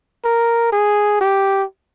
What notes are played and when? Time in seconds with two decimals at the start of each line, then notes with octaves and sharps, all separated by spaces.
0.24 A#4
0.72 G#4
1.21 G4